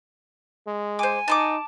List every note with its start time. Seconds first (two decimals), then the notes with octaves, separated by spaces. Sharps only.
0.67 G#3
0.99 C5 G#5 D6
1.28 D#4 A5 C6 D6